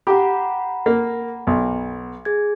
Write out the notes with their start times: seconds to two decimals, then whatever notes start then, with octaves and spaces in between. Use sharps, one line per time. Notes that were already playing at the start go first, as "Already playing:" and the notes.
0.07 G4 F#5 A#5 B5
0.86 A#3
1.47 B1
2.25 G#4 G#6